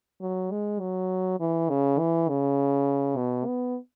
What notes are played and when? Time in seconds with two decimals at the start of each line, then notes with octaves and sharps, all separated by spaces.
0.21 F#3
0.52 G#3
0.80 F#3
1.40 E3
1.70 C#3
1.99 E3
2.29 C#3
3.16 B2
3.46 B3